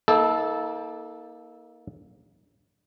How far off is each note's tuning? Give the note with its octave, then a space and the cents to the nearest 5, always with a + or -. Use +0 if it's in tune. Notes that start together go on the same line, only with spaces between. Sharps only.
A#3 +15 D#4 +45 A4 -10